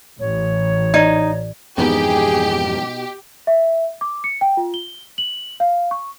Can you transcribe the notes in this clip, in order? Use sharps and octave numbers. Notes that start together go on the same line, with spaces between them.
A1 C#5
D#4 D5
F2 G#2 B2 E3 B3 D#4 G4 G#4
E5
D6
C#7
G5
F4
G7
F#7
F5
C#6